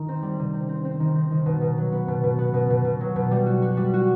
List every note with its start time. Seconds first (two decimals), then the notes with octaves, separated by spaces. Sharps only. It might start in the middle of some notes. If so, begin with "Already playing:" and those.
Already playing: D#3
0.08 C4
0.23 G3
0.39 C3
0.54 C4
0.69 C4
0.85 C4
1.00 D#3
1.15 C4
1.31 D#3
1.46 B2
1.61 B2
1.78 F#3
1.92 B3
2.08 B2
2.24 B2
2.38 B3
2.54 B2
2.70 B2
2.85 B2
3.01 F#3
3.16 B2
3.31 G3
3.46 F#4
3.62 F#4
3.77 G3
3.94 F#4